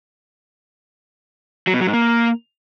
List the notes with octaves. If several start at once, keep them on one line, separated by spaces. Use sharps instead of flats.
F#3
B2
F#3
G#2
A#3